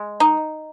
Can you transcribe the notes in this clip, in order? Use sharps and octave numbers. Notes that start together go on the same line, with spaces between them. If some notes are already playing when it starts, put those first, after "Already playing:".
Already playing: G#3
D#4